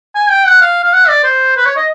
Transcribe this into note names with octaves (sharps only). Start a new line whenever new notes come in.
G#5
G5
F#5
F5
F5
F#5
D5
C5
B4
C#5
D#5